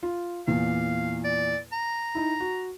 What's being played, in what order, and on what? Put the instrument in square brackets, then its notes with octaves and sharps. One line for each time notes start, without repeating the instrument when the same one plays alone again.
[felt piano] F4
[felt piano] E2 A#2 [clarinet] F5
[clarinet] D5
A#5
[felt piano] D#4 E4
F#4